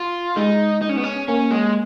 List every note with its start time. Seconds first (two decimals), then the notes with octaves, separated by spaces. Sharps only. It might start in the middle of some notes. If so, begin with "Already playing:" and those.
Already playing: F4
0.36 G#3 D#4
0.82 D#4
0.89 C#4
0.97 B3
1.04 C#4
1.28 A#3 C#4
1.51 G#3